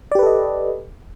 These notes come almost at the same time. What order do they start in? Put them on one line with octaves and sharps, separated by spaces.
D5 G4 B4 A4 D#5